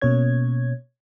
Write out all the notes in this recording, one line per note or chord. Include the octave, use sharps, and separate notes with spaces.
B2 A#3 C#4 C#5 G#6